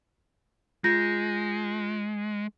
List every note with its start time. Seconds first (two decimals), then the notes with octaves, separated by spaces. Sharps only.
0.84 G#3 F4 G6 A#6